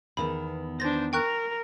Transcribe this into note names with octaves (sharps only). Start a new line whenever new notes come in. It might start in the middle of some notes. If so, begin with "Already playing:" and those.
E2 D#3 B3 B5
D4 C5 A6 A#6
A#4 G5 C#6 F#6